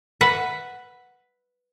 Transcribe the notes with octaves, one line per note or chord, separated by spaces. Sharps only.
B4 E5 F#5